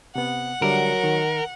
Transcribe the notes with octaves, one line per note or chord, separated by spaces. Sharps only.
C3 B3 F#5
D3 F#3 G3 A#4 E5
D#3